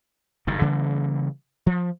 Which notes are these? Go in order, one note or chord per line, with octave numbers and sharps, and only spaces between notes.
F#1 G2 D#3
C#3 E3 G3 A#3
F3